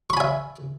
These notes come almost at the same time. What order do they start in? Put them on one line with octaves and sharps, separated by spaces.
C#6 B5 G#5 E5